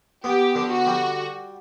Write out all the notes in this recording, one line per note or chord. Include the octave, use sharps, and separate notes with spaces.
B3 G4
D3
F#4
G3